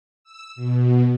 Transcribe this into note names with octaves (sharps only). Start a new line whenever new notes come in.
E6
B2